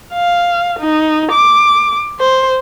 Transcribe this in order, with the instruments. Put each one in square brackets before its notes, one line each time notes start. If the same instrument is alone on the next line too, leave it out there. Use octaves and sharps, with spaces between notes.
[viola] F5
D#4
D6
C5